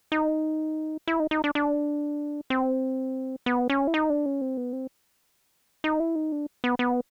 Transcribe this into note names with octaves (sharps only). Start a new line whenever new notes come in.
D#4
E4
D#4
D#4
D4
D4
C4
B3
C#4
E4
D#4
D4
C#4
C4
B3
C4
D#4
E4
D#4
D4
B3
B3